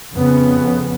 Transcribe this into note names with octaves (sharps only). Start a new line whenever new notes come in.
F2 C#3 B3